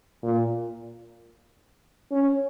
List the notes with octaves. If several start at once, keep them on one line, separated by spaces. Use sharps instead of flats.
A#2
C#4